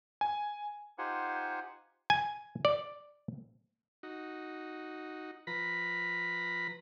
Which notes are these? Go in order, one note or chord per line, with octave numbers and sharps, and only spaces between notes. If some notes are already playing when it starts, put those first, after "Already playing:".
G#5
D#4 F4 G4 C5 F#5 G#5
G#5
D5
D#4 F#4
F3 B4 A#5 B5